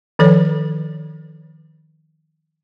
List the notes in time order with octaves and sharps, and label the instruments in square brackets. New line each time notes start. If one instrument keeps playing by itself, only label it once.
[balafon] D#3 F3 A4 B4 C#5